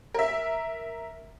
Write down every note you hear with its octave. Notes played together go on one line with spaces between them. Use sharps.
A#4 E5